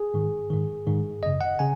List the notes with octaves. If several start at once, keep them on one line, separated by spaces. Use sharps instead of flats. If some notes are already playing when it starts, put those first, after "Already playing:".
Already playing: G#4
G#2 D#3
G#2 D#3
G#2 D#3
F#2 C#3 D#5
F#5
C#3 G#5